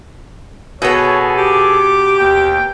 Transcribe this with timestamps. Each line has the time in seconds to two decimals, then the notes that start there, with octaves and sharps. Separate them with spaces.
0.82 B2 B3 G#4 A4 C#5 G#5
1.38 G4 D6
2.19 D#2 G5